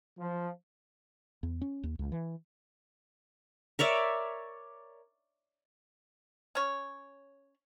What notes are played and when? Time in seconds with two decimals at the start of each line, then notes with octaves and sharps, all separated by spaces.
0.18 F3
1.43 E2
1.62 C#4
1.83 D#2
1.99 C#2
2.12 E3
3.79 A#4 C#5 D5 E5
6.55 C#4 C#5